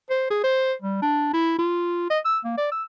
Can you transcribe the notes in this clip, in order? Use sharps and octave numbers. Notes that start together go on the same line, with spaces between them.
C5
G#4
C5
G3
D4
E4
F4
D#5
E6
A#3
D5
E6